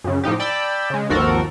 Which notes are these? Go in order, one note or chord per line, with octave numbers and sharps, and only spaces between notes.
F#2 C#3
A2 F3 D#4 G4
D5 G5 A5 B5 E6
C#3 G#3
G#1 D#2 F3 F#4 A4 A#4